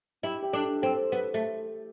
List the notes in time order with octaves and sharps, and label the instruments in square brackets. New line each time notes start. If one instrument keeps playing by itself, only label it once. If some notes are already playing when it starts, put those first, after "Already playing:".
[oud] E4 [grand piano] G4
[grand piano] G4
[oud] D4 [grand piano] A4
[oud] C4 [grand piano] A4
[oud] B3 [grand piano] A4
[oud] A3